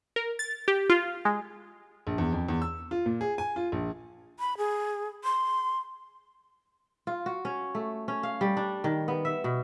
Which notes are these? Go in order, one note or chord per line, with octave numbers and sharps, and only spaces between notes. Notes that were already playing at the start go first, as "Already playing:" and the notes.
A#4
A6
G4
F4
G#3
A#1
E2
F2
E2
E6
F4
A#2
G#4
G#5
F4
A#1
B5
G#4
C6
F4
F#4
C#4
A3
C#4
F5
G3
D4
D#3
B3
E5
B2